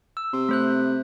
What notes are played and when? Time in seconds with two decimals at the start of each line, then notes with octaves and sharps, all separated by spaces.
0.17 E6
0.33 C3 C6 E6
0.49 A3 C5 F#6